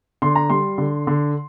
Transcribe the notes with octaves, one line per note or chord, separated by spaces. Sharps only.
D3 C6
A#5
G3 C6
D3
D3